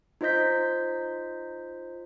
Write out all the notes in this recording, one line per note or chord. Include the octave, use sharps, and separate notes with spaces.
D#4 F4 C5 D#5 G6 B6